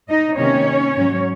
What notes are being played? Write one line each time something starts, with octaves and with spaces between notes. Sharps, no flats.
D#4 D#5
C3 D#3 A#3 C#4 D#4 C#5
G#2 F#3 C#4